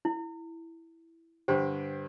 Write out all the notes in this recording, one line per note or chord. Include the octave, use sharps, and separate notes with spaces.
E4
G2 D3 G4 C5 G5